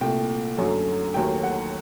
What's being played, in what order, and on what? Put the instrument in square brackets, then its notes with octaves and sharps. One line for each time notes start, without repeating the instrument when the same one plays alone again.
[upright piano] C2 A#2 A3 G5
F#2 D3 F#3 A3
D#2 D#3 F#3 A3 G5
F#5